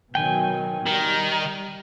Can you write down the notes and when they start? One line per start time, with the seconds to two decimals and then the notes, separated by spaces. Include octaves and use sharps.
0.15 B2 D#3 F#3 G5 G#5
0.86 D#3 G3